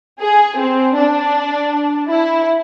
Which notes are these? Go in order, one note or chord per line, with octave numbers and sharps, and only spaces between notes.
G#4
C4
D4
E4